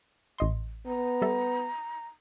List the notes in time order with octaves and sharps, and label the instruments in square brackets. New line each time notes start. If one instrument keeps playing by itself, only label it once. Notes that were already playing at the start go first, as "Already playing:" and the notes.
[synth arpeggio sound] A1 D#5 C6
[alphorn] B3 [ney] A#5
[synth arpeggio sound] G3 A4 E5